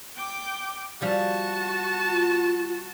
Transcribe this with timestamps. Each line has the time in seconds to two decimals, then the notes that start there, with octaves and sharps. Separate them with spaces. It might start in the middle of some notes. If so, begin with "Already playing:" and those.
0.17 G5 D6
1.01 F3 G3 F#4 G#4 A5
2.08 F4